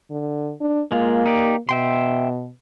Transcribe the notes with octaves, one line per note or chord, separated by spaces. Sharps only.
D3
D4
G#3 A#3 F4
D#4 G4 D5
B2 E5 G5 C6